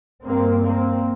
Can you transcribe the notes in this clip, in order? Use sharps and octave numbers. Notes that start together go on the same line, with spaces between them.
G2 A#3 C4
A#3 C4